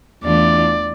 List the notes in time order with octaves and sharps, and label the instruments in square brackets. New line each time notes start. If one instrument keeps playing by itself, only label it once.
[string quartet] E2 E3 A3 D4 F4 [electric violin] D5